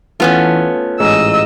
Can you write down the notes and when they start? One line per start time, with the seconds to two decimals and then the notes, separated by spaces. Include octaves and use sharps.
0.20 E3 A3 B3 C#4 F4
1.00 A1 G#2 D#5 E6